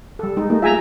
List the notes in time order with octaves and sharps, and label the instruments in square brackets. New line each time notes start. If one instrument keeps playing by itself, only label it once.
[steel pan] G3 A4
G#3 D#4
[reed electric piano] A3 A#3 [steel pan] D#4
[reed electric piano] F4 G#4 [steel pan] E5 G#5 A#5